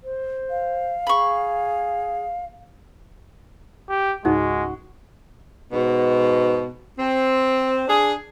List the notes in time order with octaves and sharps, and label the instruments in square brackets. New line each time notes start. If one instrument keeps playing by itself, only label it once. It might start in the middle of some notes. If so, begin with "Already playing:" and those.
[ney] C5
[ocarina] F5
[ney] G#4 [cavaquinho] B5 C#6
[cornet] G4
[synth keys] C#2 G#2 [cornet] G#3 [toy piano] D#4 [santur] F#4
[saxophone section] G#2 B2
C4
D4 G#4